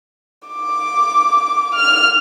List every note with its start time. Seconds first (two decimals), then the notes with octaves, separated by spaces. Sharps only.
0.48 D6
1.75 F6